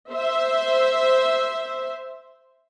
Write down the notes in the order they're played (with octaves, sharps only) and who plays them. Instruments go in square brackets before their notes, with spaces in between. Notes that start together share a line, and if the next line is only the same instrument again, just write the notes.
[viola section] C5 E5